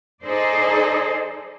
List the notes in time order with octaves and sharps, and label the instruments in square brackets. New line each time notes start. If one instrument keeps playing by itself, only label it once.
[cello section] D#4 G#4 A4 C5 D5